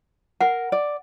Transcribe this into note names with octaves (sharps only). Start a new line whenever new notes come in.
A#4 F#5
D5